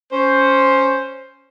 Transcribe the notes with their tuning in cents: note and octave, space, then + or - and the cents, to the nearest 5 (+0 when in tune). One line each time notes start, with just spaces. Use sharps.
C#4 +0 C5 +5